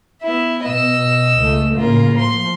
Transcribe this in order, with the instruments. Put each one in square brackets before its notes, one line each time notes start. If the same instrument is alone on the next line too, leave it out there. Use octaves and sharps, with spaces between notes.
[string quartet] B3 E4 E5
[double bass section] B2 [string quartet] D#5 E6
[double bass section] C#2 A3
[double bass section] A2 C#3 [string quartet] A#3 F4 A#4
[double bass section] F3 [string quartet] C6